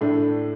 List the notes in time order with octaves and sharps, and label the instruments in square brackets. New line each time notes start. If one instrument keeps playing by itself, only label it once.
[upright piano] A2 A3 D4